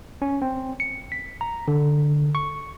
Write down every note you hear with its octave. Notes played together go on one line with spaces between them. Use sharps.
C#4
C4
C#7
B6
A#5
D3
C#6